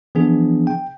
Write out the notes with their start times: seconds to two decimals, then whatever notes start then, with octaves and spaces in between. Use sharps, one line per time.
0.15 E3 F3 B3 D4 G#4
0.67 G5